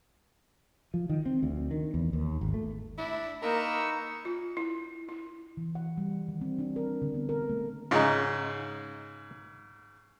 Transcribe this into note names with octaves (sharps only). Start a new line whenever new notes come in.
F3
D#3
C4
D2
D#3
E2
D#2
G#1
A3
D4 E4
A#3 D#4 A#4 B4 C#6 E6
F4
E4
E4
E3
F#5
G3
D#3
C4
D4
A#4
D3
B3
A#4
A3
G#2 C#3 D#4 F4